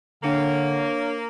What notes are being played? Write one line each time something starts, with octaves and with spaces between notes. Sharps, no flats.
D3 A#3 D4 C#5 C#7